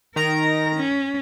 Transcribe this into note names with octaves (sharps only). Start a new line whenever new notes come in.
D#3 A#4 A#5
C#4